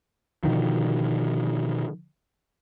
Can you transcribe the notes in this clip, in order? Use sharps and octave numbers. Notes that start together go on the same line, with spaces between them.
B2 D3 D#3 F3